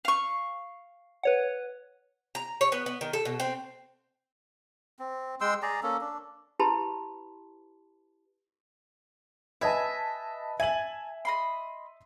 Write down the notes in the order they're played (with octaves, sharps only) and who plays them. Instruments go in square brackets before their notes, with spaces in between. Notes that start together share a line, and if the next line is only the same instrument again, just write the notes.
[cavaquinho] F5 C#6
[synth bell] B4 C#5 F#5
[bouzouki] A#5
C#5
B3
B3
D#3
A4
B2
C4
[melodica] C4
G#3 G5 C6 E6
G#4 D5 A#5
A#3 C#4 A4
D4
[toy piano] E4 G4 B4 A5 B5 C6
[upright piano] B4 D#5 A5 [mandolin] E5 G#5
[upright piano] E5 F#7 [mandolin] G#5 A5
[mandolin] D#5 B5 C6